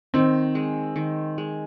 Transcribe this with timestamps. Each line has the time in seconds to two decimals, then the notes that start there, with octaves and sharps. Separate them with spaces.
0.14 D#3 C4
0.55 G#3
0.96 D#3
1.38 G#3